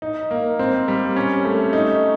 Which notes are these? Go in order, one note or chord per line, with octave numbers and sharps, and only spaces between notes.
D#4
A#3
C4
G3
C#4
A3
D#4